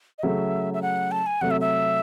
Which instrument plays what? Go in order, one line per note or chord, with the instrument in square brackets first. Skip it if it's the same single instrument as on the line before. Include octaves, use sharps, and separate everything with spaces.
[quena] D#5
[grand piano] C#3 F#3 A3 [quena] E5
[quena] E5
F#5
A5
G#5
[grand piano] C3 F#3 A3 [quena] F#5
[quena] E5
E5